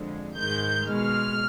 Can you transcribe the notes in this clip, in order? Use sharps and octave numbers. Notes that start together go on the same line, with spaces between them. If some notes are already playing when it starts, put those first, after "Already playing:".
Already playing: F2 D3 G#3
G#2 D#3 G#3 G6
B2 G#3 F6